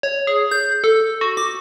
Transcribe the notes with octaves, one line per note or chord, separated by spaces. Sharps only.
C#5
G#4
G6
A4
F#4
D6